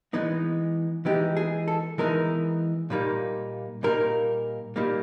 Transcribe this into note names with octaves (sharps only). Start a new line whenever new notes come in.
E3 G#3 B3 D#4
E3 G#3 B3 D#4 G4
G#4
A4
E3 G#3 B3 D#4 A#4
A#2 G3 A#3 D#4
A#2 G3 A#3 D#4 A#4
A#2 G3 A#3 D#4